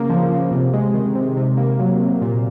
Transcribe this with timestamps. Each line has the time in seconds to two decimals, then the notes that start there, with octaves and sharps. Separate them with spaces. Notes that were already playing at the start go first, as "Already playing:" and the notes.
Already playing: C#3 A#3
0.10 F3
0.30 C#3
0.51 C3
0.73 G#3
0.94 D#3
1.15 C3
1.37 C3
1.57 A#3
1.79 F#3
2.00 C3
2.22 A#2